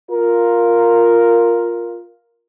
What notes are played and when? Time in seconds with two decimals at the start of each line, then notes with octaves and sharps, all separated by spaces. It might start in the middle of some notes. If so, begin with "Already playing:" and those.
0.11 F4 A#4